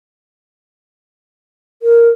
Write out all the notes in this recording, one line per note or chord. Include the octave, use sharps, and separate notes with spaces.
A#4